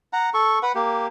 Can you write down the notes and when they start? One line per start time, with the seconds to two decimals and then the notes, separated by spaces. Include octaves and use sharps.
0.13 F#5 A#5
0.34 A4 C#6
0.63 B4 F#5
0.75 A#3 G4